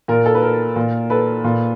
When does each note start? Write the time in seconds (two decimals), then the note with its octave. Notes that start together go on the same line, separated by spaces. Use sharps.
0.08 A#2 A#4
0.26 A4
0.35 B4
0.43 A#4
0.76 A#2
1.10 A4 B4
1.44 A#2